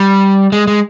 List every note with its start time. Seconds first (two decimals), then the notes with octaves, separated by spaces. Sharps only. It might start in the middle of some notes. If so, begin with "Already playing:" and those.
Already playing: G3
0.52 G#3
0.67 G#3